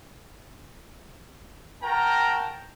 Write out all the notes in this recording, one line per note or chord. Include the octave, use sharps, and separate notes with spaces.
F#4 A#4 G5 A5 A#5